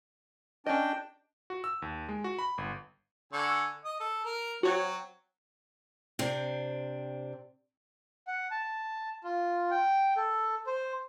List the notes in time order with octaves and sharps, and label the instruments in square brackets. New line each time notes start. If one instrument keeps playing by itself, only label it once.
[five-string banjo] C#4 D#5 [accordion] D4 G5
[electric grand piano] F#4
E6
D#2
G#3
F#4
B5
G1
[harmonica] D3 G#5 C#6
D#5 D#6
A4
A#4
[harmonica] F#3 C4 [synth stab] F#4 C#5
[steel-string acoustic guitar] C3 C4 D4
[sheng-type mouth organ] F#5
A5
F4
G5
A4
C5